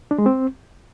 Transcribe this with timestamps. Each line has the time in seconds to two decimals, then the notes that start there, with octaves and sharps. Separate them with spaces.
0.11 D4
0.18 G#3
0.26 C4